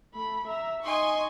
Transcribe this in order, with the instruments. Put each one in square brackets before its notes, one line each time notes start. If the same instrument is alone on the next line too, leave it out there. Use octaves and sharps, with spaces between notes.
[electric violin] A3 B5
E5 A#5
[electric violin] D#4 D#5 [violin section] G#5 C6 C#6